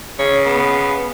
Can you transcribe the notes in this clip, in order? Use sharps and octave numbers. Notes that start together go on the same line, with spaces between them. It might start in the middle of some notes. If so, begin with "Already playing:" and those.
C#3 C#5
B3